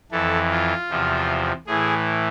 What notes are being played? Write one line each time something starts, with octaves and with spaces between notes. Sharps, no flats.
F2 E3 A4
F4
E2 C3 F3
A2 E3 G#4